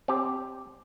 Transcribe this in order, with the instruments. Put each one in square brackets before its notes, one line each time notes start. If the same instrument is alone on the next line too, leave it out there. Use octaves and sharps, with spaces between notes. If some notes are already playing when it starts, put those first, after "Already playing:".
[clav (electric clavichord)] C4 G4